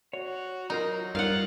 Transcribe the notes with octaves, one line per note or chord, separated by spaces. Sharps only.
F#4 C#5
F#3 D#4 F4 A#4 A#5
G2 D#4 F4 A#4 C#5 F5 F#5